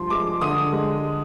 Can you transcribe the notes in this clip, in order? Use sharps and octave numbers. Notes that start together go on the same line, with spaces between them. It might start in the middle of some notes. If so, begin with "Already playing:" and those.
Already playing: G2 F3 C6
G#3 D6
D3 D#6
G#3